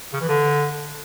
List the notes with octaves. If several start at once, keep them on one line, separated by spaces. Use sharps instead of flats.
C#3
E3
D3